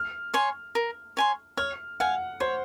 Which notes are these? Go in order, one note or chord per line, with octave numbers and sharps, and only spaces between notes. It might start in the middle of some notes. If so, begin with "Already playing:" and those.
Already playing: F6
C#5 G#5 C6
A#4
C#5 G#5 C6
C#5 F6
F5 F#5 G#5
C5 C#5